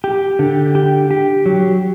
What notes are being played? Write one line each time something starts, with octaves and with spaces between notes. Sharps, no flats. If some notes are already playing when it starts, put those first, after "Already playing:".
G4
D3
G4
G4
F#3